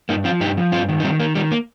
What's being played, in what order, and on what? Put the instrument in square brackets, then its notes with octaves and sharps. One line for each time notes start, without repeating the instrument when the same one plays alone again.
[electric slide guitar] G2 A#3 D#4
F3 C4 F4
G2 D#4 G4
F3
G2 C4 F4
D#3
D#4
D#3 G3 C4
D#3 A#3
D#3 G3
A#3